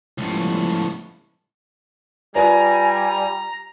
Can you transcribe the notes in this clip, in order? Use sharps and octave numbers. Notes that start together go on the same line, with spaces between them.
C#2 A2 F3 G3 B3
G3 F4 B4 D5 G#5 A#5